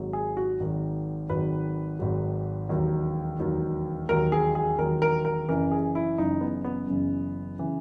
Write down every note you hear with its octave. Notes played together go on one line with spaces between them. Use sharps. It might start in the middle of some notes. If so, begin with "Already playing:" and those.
Already playing: G#1 G#2 D#3 F#3
G#4
F#4
G#1 G#2 D#3 F#3
G#1 G#2 D#3 F#3 B4
G#1 G#2 D#3 F#3
E1 D#2 D#3 F#3
E1 D#2 D#3 F#3
E1 D#2 D#3 F#3 A#4
G#4
G#4
E1 D#2 D#3 F#3 A#4
A#4
A#4
F#1 F#2 C#3 E3 A#4
G#4
E4
F#1 F#2 C#3 E3 D#4
B3
B3
F#1 F#2 C#3 E3
C#3 E3